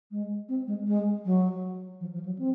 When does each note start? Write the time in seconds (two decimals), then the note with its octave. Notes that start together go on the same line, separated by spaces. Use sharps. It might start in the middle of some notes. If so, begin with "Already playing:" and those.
0.11 G#3
0.49 C4
0.67 G#3
0.87 G#3
1.25 F#3
2.01 F3
2.14 F3
2.25 F#3
2.38 C4